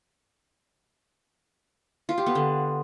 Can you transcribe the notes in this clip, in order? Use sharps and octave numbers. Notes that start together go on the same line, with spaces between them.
F4
G4
B3
D3